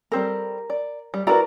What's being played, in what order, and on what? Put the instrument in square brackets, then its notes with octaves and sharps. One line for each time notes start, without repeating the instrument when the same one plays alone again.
[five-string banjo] G3 C4 A4 [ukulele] A#4
[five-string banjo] D5
G3
[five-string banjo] E4 A#4 B4 [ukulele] F#4 D5 A#5